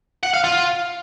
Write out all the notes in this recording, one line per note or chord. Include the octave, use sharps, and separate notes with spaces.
F#5
F5
F4